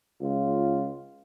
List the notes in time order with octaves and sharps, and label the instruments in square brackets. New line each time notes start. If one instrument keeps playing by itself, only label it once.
[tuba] C#2 [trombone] F4